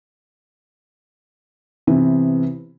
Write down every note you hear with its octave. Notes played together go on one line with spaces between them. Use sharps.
C3 E3 B3